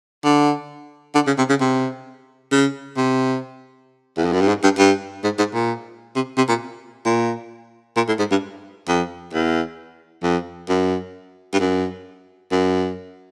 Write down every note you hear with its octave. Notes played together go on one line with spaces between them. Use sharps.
D3
D3
C#3
C3
C#3
C3
C#3
C3
E2
F2
F#2
G2
G#2
G2
G2
G#2
G#2
A#2
C3
C3
A#2
A#2
A#2
A2
G#2
G2
F2
E2
F2
F#2
G2
F#2
F#2